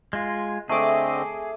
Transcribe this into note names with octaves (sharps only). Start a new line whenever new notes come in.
G#3 F4
D3 A3 C4 G#4 D#5 D6